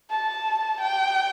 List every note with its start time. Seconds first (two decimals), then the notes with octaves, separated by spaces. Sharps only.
0.11 A5
0.81 G5